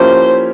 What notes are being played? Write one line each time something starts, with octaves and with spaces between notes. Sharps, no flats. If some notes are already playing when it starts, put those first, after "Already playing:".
Already playing: F3 A#3 C#4 E4 G4 C5